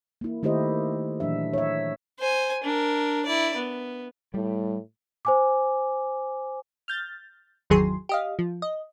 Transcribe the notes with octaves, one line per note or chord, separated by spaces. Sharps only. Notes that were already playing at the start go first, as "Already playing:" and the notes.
A#3 E4
D#3 A3 E4 G4 C5 D#5
A#2 E3 F#3 D4 E5
C#5 E5
C5 G#5
D4 A#4
E4 D5
B3
A2 G3
C5 G#5 D6
F6 G6 A6
G#1 E2 D#3 F#3 G#4 C6
G4 D#5 F5
F3
D#5